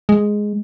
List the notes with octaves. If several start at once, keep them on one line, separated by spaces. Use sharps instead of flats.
G#3